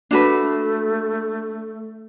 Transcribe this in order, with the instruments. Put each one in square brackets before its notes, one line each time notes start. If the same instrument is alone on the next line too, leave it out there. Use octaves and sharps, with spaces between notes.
[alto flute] A3 [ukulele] D4 F#4 B4